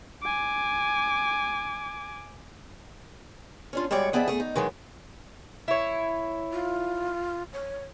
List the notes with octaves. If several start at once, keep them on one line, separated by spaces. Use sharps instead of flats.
G#5 D6
C#4 D4 F4
G3 G#3 F#4 C#5 D5
F2 B3 G#4 D5 E5
A3 G#4
D#4
D#3 E3 F#3 G#3
E4 C#5
F4
C#5